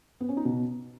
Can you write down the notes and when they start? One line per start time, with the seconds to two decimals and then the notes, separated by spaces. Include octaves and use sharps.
0.21 B3
0.29 C#4
0.37 D#4
0.45 B2